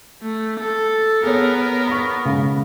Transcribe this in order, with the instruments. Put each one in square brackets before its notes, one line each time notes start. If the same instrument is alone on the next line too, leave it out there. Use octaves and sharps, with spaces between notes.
[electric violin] A3
A4
[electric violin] B3 A#4 [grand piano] G#4 C#5
[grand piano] B5 C#6
C#3 G#3